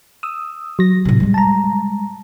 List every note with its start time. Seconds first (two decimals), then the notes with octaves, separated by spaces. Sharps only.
0.23 D#6 E6
0.79 F#3 A#6
1.05 A2 C3
1.20 G3 G#3
1.34 A5 A#5